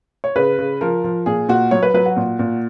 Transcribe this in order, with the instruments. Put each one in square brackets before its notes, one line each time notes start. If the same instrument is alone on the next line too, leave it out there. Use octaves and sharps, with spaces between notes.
[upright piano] C#5
C#3 B4
C#3
F3 A#4
F3
A#2 G#4
A#2 F#4
F#3 C#5
B4
F#3 B4
F#4
A#2
A#2